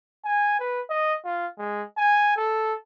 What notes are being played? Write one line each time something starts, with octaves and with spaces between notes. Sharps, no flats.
G#5
B4
D#5
F4
G#3
G#5
A4